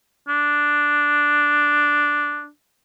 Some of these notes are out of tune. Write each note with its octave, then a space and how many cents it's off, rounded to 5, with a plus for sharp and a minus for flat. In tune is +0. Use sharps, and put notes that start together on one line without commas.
D4 +0